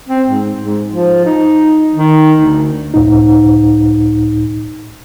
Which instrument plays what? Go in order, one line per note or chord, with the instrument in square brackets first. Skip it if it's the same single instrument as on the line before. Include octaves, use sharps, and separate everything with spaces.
[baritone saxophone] C4
G#2
G#2
F3
D#4
D#3
D2
[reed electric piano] C#2 A2 D#4